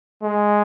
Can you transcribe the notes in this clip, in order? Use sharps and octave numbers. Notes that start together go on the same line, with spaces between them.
G#3